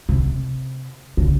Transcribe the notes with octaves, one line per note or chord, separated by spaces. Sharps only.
C3
C#3